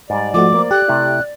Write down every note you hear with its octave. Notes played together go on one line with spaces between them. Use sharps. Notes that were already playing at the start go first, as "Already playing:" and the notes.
G#2 G3 D5
F3 A3 F#4 D6
A#3 C5
G4 A4 F#6
C3 A3 E4